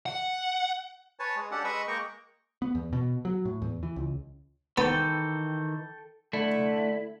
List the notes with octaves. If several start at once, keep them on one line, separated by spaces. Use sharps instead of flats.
F#5
B4 C#5 G#5 A5
G#3
C#4 D4 G4 A4 F#5
G#3 B4 D#5 B5 C#6 E6
G#3 A#3 G5 A#5 C#6
B3
E2
B2
F#3
A2
E2
E3
C#2
D#3 E3 B3 A4 G5
D3 A3 E4